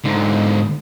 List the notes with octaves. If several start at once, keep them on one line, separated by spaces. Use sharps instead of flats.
G#2 D3